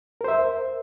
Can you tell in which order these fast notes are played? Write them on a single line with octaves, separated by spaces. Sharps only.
A#4 C5 E5